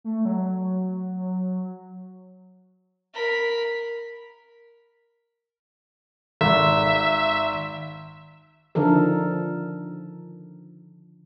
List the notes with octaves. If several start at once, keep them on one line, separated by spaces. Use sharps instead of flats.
A3
F#3
A#4 B5
G#1 E5
D3 D#3 F3 A4 A#4